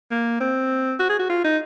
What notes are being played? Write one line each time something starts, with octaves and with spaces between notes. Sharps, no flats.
A#3
C4
F#4
G#4
F#4
F4
D#4